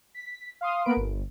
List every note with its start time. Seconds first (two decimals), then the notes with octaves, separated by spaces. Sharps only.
0.14 B6
0.61 F5 C6 D#6
0.85 A#3 B3 A#4 B4 B5 D7
0.97 G1